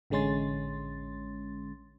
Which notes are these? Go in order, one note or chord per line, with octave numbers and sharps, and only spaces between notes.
A1 D3 G#3 C#4 C6 A6